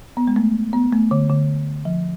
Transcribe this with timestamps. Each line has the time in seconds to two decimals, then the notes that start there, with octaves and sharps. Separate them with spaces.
0.17 B3
0.27 G#3
0.36 A3
0.73 B3
0.93 A3
1.11 D3
1.29 D3
1.85 F3